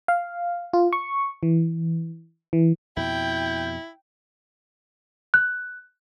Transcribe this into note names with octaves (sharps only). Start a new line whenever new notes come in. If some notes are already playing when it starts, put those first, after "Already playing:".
F5
F4
C#6
E3
E3
F2 B2 E4 G5 G6
F#6